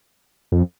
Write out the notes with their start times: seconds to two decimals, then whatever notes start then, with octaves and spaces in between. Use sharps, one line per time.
0.52 F2